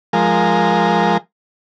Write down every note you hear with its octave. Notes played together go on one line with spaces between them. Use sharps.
F3 G#3 A#4